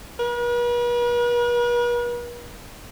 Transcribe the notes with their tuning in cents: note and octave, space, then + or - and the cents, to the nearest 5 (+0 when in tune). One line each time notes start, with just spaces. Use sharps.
B4 -45